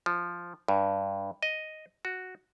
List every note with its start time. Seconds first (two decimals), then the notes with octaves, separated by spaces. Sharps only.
0.06 F3
0.68 G2
1.43 D#5
2.05 F#4